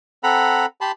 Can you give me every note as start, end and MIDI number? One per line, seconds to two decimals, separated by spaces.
0.23 0.66 60
0.23 0.66 69
0.23 0.66 78
0.23 0.66 82
0.23 0.66 83
0.81 0.92 67
0.81 0.92 81
0.81 0.92 83
0.81 0.92 84